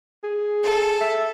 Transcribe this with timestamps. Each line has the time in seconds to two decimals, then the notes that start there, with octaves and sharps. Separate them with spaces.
0.23 G#4
0.63 A4
1.01 E5